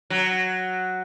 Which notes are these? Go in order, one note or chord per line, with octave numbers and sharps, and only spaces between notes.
F#3